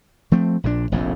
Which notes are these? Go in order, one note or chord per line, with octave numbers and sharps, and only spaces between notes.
F3 A3 C4
A#1 A#2 D3 D4
F1 A#1 F2 A2